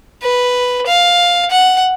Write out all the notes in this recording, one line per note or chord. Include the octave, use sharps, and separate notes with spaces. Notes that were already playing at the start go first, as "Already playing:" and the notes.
B4
F5
F#5